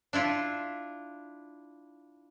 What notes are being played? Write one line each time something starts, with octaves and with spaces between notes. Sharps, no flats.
D4 E4 F4